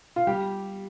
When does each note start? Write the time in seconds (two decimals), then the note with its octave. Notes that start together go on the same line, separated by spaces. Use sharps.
0.16 F4
0.27 G3 G4